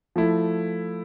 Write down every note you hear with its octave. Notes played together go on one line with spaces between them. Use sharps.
F3 A3 E4